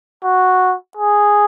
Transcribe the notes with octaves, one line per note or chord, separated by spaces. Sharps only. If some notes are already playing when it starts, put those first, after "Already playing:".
F#4
G#4